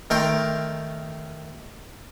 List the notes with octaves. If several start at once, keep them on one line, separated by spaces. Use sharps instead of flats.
D#3 A3 A#4 G5 C6